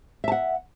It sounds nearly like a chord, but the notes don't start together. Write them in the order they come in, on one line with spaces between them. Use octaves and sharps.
E5 A5 F#5